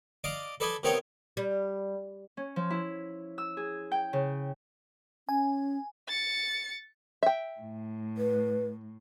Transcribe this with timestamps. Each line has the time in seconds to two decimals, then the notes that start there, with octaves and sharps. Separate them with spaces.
0.24 D5 D#5 F5 D6 D#6
0.60 A4 B4 D5 D#5 G#5
0.83 C3 D#3 B3 D#4 C#5 G5
1.37 G3
2.37 C#4
2.56 F3
2.70 E4
3.38 E6
3.57 G#4
3.91 G5
4.13 C#3
5.29 C#4 G#5
6.08 A6 C#7
7.23 E5 G5
7.60 A2
8.17 B4